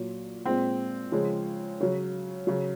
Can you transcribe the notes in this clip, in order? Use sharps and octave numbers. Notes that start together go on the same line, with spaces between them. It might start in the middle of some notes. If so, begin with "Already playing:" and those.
Already playing: A#2 F#3
A#2 G#3 C4
C#3 F3 G#3
C#3 F#3
C#3 F#3